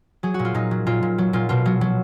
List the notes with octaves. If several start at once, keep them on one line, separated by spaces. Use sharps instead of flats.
F#3 G#4
F#4
A#2
F4
A#2 D#4
F#3
A#2 F4
A#2
F#3
A#2 F4
B2 F4
F#3
F#3